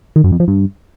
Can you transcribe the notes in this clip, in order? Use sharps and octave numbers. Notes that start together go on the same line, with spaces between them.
D#3
F#2
F2
F3
G2